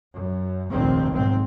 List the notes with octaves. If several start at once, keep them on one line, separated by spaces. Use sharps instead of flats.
F#2
F1 A#1 D#2 D#3 C4
B1 G#2 C4